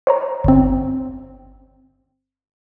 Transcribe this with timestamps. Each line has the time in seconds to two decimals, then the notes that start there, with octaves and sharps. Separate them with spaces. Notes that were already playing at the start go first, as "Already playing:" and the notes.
0.07 C5 C#5 A#5
0.44 G1 C4